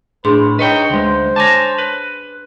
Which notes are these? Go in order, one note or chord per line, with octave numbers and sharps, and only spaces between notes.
A2 D4 G#4 B4 C6
D#4 B4 C#5 D#5 G5
D2 G#3 C5
C#5 G#5 A5 D6 A#6
B4